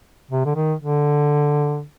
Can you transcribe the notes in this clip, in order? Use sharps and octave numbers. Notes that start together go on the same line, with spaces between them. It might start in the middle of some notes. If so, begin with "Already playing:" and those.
C3
D3
D#3
D3